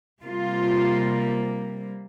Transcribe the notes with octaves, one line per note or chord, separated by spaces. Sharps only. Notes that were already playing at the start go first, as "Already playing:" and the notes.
C3 G3 A#3 F4